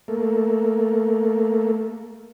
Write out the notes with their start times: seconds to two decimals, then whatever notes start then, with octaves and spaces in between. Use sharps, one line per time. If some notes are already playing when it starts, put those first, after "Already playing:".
0.08 A3 A#3